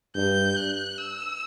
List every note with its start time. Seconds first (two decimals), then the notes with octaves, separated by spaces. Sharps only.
0.16 G2 G6
0.56 F#6
0.98 E6